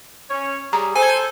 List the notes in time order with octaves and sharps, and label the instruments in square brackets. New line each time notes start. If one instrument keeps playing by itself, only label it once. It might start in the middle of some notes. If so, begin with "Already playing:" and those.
[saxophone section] C#4 C#5
[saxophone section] G3 G#4 [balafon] A#5
[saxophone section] A4 C5 [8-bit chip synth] G#5